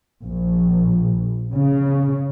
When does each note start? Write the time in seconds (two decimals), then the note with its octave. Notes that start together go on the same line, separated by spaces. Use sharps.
0.25 A#1
1.54 C#3